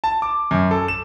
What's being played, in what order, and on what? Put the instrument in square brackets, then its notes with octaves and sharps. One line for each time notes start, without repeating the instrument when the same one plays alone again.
[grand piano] A5
D6
F#2
A4
E7